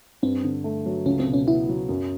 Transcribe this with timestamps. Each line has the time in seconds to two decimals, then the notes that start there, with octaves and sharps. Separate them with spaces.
0.23 G2 C4
0.44 D3
0.64 A3
0.86 F#3
1.05 C#2 C#4
1.20 C4
1.26 B2
1.33 C#4
1.47 B3 E4
1.69 F#3
1.89 F#2